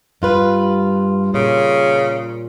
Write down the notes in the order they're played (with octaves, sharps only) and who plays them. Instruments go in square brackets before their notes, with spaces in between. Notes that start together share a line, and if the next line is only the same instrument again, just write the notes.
[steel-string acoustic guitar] G2 F4 B4
[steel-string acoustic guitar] A#2 [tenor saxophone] C#3